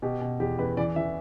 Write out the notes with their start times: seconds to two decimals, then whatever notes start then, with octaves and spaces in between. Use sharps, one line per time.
0.02 B2 G4
0.21 B2
0.40 E2 G4
0.58 E2 B4
0.77 E3 D5
0.96 E3 E5